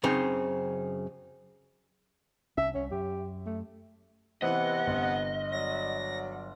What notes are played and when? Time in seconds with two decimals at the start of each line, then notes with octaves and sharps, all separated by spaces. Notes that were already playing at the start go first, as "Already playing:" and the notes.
0.03 F#2 C#3 C4 D#4
2.57 C2 C#4 E5
2.75 C2 C#4
2.91 F#2 G4
3.46 A3
4.42 C3 E3 B3 C4 E4 D#5 F#5
4.87 G1
5.52 F#3 D5 A#6